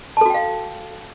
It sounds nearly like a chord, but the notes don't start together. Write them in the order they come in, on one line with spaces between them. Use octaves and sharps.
A5 A4 F#4 G5 F5